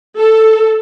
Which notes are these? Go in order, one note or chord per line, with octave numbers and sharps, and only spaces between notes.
A4